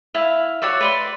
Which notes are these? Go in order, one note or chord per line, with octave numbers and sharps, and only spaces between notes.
E4 F5
F#4 C#5 D5 E5
B4 D5 C6